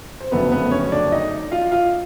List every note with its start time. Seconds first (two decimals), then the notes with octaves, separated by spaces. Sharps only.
0.20 C5
0.31 F#1 F2 D3 F#3 A3 B3 B4
0.52 B3 B4
0.71 C#4 C#5
0.92 D4 D5
1.12 D#4 D#5
1.52 F4 F5
1.71 F4 F5